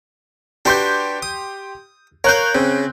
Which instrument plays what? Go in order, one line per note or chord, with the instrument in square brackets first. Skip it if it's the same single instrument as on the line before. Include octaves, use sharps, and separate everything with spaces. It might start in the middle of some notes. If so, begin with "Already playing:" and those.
[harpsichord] D4 F#4 B4 [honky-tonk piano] G4 C6 G6
[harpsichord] D#6
[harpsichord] A#4 F5 [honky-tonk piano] C#5 F#6 G6
[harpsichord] C#3 [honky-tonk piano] C4